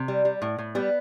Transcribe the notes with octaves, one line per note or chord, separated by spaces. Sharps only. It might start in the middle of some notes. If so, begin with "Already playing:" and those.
Already playing: C3
G3
G3
A2
A2
G3 B3